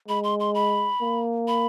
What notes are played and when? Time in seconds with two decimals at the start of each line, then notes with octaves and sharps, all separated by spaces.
0.08 G#3 B5
0.24 C6
0.40 C6
0.55 B5
1.01 A#3
1.48 B5